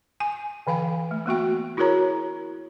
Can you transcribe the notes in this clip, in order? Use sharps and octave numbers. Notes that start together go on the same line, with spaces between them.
G#5
D3 E3 F5 G5 G#5
A3
A#3 B3 F#4 G5
E4 F#4 G#4 A#4 C#5 A#5